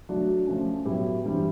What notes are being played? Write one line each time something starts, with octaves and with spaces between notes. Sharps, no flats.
F#3 A3 D4 F#4
F3 A3 C#4
A2 F#3 B3 E4 G4
G2 E3 G3 C4